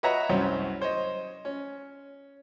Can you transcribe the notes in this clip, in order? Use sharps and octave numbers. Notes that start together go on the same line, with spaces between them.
B4 C#5 D#5 E5 F#5 A#5
C2 F#2 C#4 F#4 C5
C5 C#5 D#5
C#4